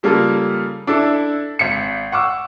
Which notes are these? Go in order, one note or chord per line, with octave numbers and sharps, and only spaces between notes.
C#3 G3 A#3 F4 A4
D4 E4 A4
G#1 B6 C#7
F#5 C#6 D6 E6